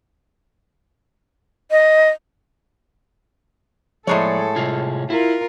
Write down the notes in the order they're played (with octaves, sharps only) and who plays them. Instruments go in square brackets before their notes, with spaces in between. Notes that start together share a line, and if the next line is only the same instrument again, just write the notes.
[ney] D#5
[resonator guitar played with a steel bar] A2 G#3 C#5 [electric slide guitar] F3 D5 [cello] A4
[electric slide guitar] C3 F4 G#4
[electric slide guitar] E4 [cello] F4 A#4